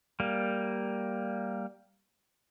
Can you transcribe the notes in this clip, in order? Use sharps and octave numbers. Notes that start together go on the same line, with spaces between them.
G3 A#3